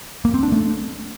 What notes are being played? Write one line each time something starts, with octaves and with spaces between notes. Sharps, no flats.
A#3
C4
D4
A3